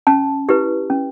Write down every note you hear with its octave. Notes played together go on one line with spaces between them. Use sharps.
C#4 A5
E4 G4 B4
C#4